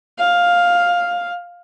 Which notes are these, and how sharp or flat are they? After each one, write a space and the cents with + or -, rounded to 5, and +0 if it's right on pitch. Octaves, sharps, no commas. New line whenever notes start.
F5 +10